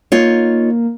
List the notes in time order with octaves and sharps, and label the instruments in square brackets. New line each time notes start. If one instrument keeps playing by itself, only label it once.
[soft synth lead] A#3 [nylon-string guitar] D#4 F4 C#5